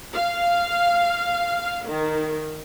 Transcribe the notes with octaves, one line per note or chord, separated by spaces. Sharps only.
F5
D#3